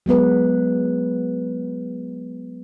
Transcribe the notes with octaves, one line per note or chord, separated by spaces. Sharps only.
F#3 G#3 B3 B4